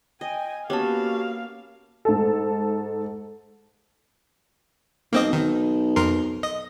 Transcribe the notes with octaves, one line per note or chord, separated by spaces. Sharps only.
D#5 G5 G#5
A#3 B3 C#4 F#4 G4 F5 A5
G#2 A4
B1 A#3 C4 D#5
D#3
F2 A#4 C6
D#5